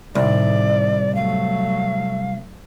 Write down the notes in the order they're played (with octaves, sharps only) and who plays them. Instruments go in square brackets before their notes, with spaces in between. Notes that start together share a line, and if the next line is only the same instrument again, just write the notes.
[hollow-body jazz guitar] C2 [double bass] A2 D#3 [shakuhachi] D5
[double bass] F#3 A3 [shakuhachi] F5